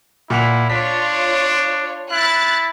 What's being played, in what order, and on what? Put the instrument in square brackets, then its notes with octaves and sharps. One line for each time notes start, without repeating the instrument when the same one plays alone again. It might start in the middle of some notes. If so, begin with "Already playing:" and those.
[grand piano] A#2 F#5 F7 [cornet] E4
[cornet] D4 [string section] F4 C#5 [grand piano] B6
[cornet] E4 [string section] F#6 A6